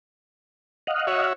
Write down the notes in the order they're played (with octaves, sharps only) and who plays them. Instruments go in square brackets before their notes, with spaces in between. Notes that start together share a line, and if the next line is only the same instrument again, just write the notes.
[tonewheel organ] D#5 F5 F#5
[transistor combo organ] F#4 C#5 E5